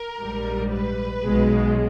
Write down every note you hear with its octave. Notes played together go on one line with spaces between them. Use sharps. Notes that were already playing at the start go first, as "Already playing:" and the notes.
Already playing: A#4
A#1 G#2 G3
B4
B1 B2 G#3